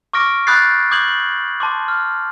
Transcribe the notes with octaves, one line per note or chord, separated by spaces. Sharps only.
C#6 D6 F6 A#6 D7
B5 D#6 F#6 G6 A6 C7
D6 D#6 G6 G#6 F#7
A5 C6 D6
F6